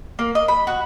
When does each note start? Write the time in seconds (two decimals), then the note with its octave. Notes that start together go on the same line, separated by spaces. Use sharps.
0.19 A#3
0.35 D#5
0.48 B5
0.67 F#4